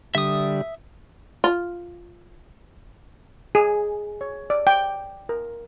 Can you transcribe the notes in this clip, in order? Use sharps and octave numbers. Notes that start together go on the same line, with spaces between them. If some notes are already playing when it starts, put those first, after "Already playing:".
D3 G3 E5 D#6
F4
G#4
C#5
D5
G5
A#4